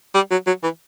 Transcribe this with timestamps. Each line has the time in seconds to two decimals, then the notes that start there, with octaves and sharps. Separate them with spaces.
0.15 G3
0.31 F#3
0.47 F#3
0.63 E3